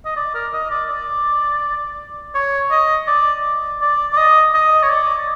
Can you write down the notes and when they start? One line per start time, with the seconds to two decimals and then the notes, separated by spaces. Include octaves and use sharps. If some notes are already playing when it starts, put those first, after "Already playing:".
0.05 D#5
0.17 D5
0.34 A#4
0.53 D#5
0.71 D5
0.90 D5
2.35 C#5
2.71 D#5
3.08 D5
3.81 D5
4.13 D5
4.17 D#5
4.54 D#5
4.83 C#5
4.90 D5